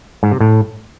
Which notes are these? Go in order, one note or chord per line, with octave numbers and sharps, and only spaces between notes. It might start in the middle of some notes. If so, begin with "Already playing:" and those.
G#2
C3
A2